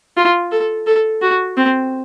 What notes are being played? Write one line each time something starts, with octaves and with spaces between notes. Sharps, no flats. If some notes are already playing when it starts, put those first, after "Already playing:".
F4
A4
A4
F#4
C4